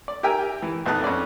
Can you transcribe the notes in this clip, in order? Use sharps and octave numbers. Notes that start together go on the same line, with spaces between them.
D5
G4 A#4 E5 G5 G#5 A#5
E3
A#1 F2 B3 D#4 A5 F#6
F2 C#4 D5 E5